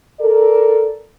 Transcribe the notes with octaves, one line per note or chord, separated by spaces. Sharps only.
A4 A#4 D5